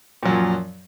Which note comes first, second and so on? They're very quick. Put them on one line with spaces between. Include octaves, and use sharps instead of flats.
A#2 F#3 F#2 F3